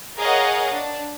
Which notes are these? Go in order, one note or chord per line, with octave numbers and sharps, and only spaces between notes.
G#4 A#4 C#5 D#5 F5 F#5
D4